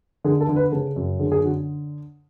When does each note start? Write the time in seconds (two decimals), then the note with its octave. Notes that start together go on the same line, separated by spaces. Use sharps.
0.24 D3 G#4
0.41 A4
0.49 D3
0.56 B4
0.72 C#3 A4
0.96 F#2
1.19 D3 G#4
1.32 G#4
1.43 D3 F#4